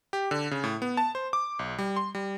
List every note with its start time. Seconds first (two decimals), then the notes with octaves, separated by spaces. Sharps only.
0.13 G4
0.31 D3
0.51 C#3
0.64 A2
0.82 B3
0.97 A5
1.15 C5
1.33 D6
1.59 B1
1.79 G3
1.96 C6
2.15 G3